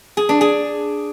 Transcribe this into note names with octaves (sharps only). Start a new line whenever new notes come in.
G#4
D4
G#4